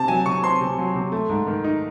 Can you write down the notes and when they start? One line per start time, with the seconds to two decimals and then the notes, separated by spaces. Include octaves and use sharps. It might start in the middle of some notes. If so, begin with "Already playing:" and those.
Already playing: C3 C4 A5
0.08 F#3 G#5
0.26 C3 C#6
0.43 C4 C6
0.61 C3
0.78 F#3
0.96 C3
1.12 A3
1.29 G#2
1.47 D#3
1.64 D#4